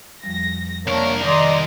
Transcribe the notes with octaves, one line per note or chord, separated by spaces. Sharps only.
F2 F3 G3 A#6
C2 A#3 D4 A#4 C#5
D#3 D5 D#5 C6